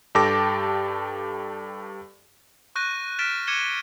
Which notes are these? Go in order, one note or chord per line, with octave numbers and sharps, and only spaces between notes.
G2 G4 A4 A5 D6 A#6
C#6 F#6 G6 A#6 D#7
F6 F#6 A6 B6 D7 E7
D6 G#6 C#7 D#7 E7 G7